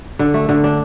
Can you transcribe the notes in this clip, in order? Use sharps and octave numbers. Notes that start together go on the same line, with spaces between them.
D3
A3
D3
D4